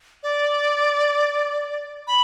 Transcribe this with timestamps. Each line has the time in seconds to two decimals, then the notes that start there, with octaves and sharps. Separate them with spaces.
0.23 D5
2.07 B5